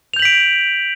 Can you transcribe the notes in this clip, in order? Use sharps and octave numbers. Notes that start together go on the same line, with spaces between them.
G6 B6 D7 F7 F#7